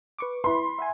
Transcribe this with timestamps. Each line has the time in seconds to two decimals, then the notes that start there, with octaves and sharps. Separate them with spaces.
0.19 B4 C#6 D6
0.44 E4 B4 B5 C6
0.79 E5 F#5 G#5